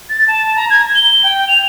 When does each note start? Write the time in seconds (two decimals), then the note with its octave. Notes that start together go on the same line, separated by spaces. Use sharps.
0.10 A6
0.28 A5
0.56 A#5
0.70 G#6
0.95 G7
1.24 G5
1.48 F7